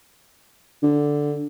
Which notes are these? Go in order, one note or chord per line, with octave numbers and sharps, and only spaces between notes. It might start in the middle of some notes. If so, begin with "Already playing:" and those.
D3